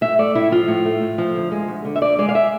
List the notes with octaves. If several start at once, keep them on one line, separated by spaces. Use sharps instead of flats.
A2 E5
A3 D5
A2 E4
F3 F4
A2
A3
A2
F3
D2
G#3
D2
D3
E5
D2 D5
G#3 D5
F5
E5